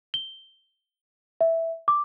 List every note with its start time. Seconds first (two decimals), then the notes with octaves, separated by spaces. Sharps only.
0.14 G7
1.41 E5
1.88 D6